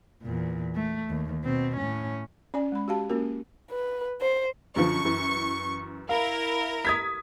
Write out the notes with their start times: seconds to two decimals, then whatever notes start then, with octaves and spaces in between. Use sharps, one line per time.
0.22 E2 A#2
0.75 A3
1.10 D#2
1.44 B2 C4
1.77 A2 C#4
2.54 C#4 D5 G#5
2.72 G#3 B5
2.88 F#4 G4 F5 A5
3.10 A#3 C#4 F4 F#4 A#4
3.71 B4
4.21 C5
4.76 F#2 D3 F3 C#6
5.05 F#2 E3
6.09 E4 A#4 F5
6.85 D#6 G#6 B6